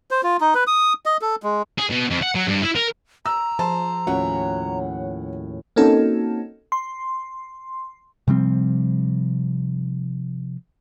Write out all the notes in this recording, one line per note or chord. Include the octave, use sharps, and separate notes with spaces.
C5
F4
D#4
B4
D#6
D#5
A4
G#3
G#4
B2
F2
F#5
F#3
G2
E4
A#4
A#5 E6
F3 G#4 C5 A5
D#2 A2 C#4 F4 F#4 C#5 F#5
A#3 C4 C#4 D#4 F#4 A4
C6
C3 F3 G3 C4